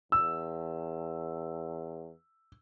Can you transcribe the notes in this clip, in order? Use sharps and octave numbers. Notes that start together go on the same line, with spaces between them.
E2 E6